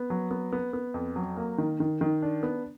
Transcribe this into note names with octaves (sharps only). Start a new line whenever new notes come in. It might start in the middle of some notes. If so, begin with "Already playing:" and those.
Already playing: B3
F#3
B3
B3
B3
F2
F#3
A#3
D#3
D#3
D#3
D4
B3